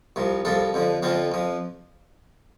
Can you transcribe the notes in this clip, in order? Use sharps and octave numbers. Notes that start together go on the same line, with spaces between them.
C2 C3 F3
C2 C3 F3 F4 A4
F2 D3 F3
F2 D3 F3 C4 F4
F2 F3